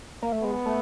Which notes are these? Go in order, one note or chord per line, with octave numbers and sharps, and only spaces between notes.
A#3
A3
G#3 B3
A3